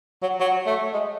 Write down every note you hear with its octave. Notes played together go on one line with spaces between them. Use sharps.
F#3
F#3
A3
G#3